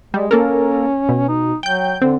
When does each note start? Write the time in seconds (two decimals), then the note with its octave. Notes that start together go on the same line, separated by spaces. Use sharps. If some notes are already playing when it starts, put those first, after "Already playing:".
0.14 G3 G#3
0.31 A#3 C#4 A4 A#4
1.09 B2
1.28 D#4
1.63 F#3 G5 G6
2.02 D3 C4